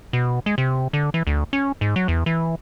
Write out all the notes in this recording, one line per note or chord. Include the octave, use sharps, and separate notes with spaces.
B2
G#3
C3
D3
E3
D2
C#4
G#2
F#3
E2
E3